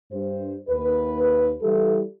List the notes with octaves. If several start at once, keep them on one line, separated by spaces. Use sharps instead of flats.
G2 C5
D#2 B4
E3 G3 E4 F4 A4